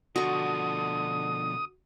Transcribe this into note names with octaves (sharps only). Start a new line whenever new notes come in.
B2 D3 F3 F#4 C#6 D#6